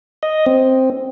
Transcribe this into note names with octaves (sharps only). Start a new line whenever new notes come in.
D#5
C4